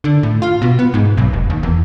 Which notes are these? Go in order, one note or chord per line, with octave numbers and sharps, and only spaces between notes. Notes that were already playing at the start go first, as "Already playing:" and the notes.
D3
A2
F4
B2
B3
G#2
B1
F1
D#2
E2